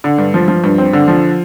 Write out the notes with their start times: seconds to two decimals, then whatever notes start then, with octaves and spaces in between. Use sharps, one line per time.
0.04 D3
0.18 G2
0.34 F3
0.48 F3
0.64 G2
0.78 C4
0.93 D3
1.08 F3